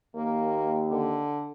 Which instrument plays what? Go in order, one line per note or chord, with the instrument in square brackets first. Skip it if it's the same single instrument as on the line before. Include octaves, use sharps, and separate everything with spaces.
[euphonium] D#2 [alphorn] A#3
[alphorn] D3